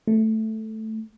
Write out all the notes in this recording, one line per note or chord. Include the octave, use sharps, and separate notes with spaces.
A3